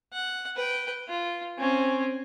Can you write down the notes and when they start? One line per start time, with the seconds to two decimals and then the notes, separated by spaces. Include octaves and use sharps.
0.13 F#5
0.56 B4 G5
1.08 F4
1.58 C4 C#4